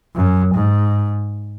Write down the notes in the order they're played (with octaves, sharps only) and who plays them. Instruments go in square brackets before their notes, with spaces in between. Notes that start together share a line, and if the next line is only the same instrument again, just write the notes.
[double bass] F#2
G#2